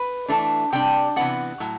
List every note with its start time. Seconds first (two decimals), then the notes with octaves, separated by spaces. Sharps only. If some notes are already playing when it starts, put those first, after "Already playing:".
Already playing: B4
0.28 E3 A3 D4
0.72 C3 G3 D4 G5
1.16 C3 E3 B3 D4 F#5
1.60 A2 F#3